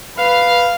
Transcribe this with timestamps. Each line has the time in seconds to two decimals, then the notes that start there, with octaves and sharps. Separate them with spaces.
0.18 B4 F5